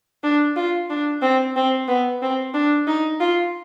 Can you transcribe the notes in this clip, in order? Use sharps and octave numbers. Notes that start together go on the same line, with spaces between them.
D4
F4
D4
C4
C4
B3
C4
D4
D#4
F4